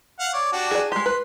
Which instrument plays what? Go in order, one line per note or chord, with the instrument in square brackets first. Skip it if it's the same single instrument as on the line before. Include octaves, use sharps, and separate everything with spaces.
[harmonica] F5 F#5
C#5 D5
D4 F#4 G4
[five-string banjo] G#4 D5
[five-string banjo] G#3 G4 [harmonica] C6
[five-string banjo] B4